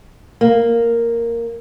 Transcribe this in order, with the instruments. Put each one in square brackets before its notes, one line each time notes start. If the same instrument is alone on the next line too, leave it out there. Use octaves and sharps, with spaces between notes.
[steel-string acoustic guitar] A#3